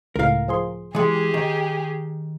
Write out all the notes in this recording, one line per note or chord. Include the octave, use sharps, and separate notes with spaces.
C#2 A2 A#4 F5
F3 G#4 C6
E3 G#3 G4 G#4 D#6
D#3